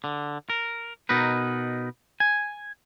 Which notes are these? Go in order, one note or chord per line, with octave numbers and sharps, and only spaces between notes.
D3
A#4
B2 D#4 A#4 B4
G#5